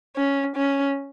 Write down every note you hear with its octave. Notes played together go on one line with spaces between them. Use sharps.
C#4
C#4